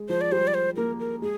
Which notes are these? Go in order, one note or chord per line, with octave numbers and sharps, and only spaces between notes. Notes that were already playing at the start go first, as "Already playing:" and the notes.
Already playing: G#3
F3 C5
D5
G3 C5
D5
C5
A#3 A#4
A#4
G#3 G#4